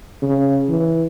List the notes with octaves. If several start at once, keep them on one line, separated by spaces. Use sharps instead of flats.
C#3
E3